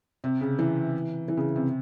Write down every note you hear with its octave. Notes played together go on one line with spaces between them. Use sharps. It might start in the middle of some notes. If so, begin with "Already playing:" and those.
C3
C#3
E3
E3
C#3
C3